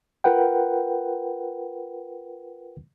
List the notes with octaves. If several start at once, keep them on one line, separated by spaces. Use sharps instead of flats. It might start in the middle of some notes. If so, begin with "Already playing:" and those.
F4 A#4 B4 F#5 G5